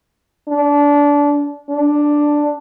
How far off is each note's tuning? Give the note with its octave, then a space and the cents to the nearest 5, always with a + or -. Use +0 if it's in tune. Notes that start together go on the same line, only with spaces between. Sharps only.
D4 -25
D4 +0